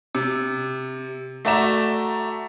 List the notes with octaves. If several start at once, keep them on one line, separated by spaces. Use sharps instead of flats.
C3
A3 F#4 D5 E5 A#5 E7